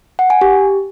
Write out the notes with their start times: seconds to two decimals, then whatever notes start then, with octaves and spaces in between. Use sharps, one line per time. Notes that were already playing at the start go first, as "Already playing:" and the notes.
0.19 F#5
0.30 G#5
0.41 G4